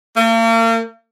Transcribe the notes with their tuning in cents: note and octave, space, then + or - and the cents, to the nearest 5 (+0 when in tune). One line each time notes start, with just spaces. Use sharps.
A#3 -40